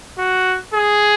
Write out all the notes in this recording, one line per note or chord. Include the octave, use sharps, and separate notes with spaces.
F#4
G#4